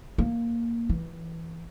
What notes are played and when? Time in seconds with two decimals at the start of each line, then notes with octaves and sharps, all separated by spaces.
0.18 A#3
0.90 E3